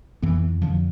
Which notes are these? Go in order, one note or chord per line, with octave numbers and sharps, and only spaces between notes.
F2 E3 B3
F2 D3 F3